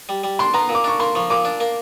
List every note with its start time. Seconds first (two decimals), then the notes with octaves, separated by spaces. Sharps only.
0.09 G3
0.24 G3
0.39 D4 C6
0.54 B3 A#5
0.69 A#2
0.75 D6
0.84 D4 C#6
1.00 A#3 C6
1.15 F3 C#6
1.30 A#2 D6
1.45 D4
1.60 A#3